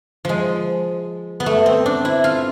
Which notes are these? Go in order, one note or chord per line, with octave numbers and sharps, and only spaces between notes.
F3 G#3
B3
A3
C4
D4
E4
F4